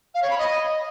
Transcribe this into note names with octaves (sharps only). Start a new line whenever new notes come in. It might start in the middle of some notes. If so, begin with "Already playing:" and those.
F5
C#5
B5
D#5